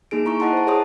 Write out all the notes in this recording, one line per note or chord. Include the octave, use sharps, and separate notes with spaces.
A#3 D#4 G#4 D7
E4 A#5 C#6 D7
E4 D#5 F#5 A5 C6
C5 A5
G#4 C#5 A5 C6 D#6